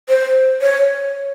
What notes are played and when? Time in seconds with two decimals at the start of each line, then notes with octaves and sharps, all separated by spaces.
0.09 C5
0.62 C#5